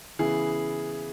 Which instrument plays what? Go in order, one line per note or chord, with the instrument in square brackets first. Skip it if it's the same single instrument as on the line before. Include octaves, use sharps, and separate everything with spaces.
[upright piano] C#3 E3 B3 E4 [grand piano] G#4